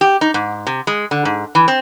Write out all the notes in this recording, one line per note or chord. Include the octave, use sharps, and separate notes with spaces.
G4
D#4
G#2
C3
G#3
D3
G#2
E3
C4